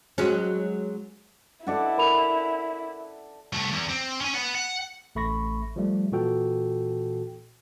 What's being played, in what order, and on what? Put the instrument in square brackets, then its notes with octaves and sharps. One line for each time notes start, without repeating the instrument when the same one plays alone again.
[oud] F#3 G#3 C#4
[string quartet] E4 [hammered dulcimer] A4 D5 F#5
[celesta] A#4 B5 F7
[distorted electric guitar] C2 A3
E2
C4
C#4 G#5
B3 F#5
F#5
[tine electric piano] A1 A3 B5 C#6 A#6
F3 G3 A3
A#2 E3 F#4 A4 G5